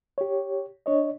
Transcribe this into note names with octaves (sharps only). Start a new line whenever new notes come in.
G4 C#5
D4 C#5 D#5